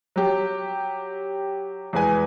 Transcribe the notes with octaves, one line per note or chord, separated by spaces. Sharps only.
F#3 G4
E2 G#3 B4 G#5